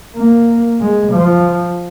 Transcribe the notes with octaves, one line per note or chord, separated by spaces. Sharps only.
A#3
G#3
F3